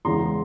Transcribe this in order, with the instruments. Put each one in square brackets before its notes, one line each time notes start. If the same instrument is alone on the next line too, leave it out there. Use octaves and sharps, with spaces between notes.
[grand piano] E2 C#3 E3 G#3 A#5 C6